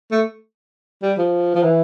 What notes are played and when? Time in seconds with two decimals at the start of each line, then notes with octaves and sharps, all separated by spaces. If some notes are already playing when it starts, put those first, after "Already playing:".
0.12 A3
1.02 G3
1.18 F3
1.55 F3
1.63 E3